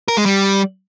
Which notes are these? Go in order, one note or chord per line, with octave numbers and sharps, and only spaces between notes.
A#4
G#3
G3